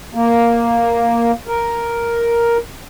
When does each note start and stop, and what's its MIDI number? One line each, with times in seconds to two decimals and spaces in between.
0.15 1.31 58
1.47 2.57 70